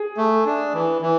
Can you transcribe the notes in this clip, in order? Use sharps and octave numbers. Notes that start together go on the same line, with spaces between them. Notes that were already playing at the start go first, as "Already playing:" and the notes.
Already playing: G#4
A3
D4
E3
E3